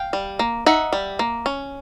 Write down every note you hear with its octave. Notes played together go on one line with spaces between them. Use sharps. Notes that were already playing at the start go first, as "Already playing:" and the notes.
Already playing: F5 G5
G3
A#3
D#4 E5 F#5
G3
A#3
C#4